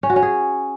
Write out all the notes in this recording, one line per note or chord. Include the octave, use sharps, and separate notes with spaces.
C#4
F#4
C#4
G#4